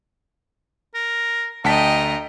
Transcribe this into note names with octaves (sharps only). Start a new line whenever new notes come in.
A#4
D2 D#5 G5 A5 A#5 B6